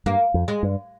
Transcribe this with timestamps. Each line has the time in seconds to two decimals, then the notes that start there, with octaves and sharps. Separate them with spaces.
0.06 G2 A#3
0.34 F2
0.48 G#3
0.63 G2